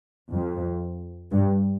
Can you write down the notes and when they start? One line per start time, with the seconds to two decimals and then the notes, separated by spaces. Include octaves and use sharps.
0.31 F2
1.31 G2